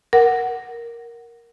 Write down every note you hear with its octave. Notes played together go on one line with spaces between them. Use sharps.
A#4 F#5